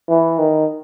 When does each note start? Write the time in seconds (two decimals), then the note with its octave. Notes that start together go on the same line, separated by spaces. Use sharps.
0.09 E3
0.39 D#3